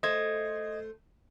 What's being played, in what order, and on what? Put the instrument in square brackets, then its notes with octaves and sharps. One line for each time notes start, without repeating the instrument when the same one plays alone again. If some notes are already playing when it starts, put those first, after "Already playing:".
[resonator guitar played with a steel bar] A3 C5 [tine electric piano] D#5 G#6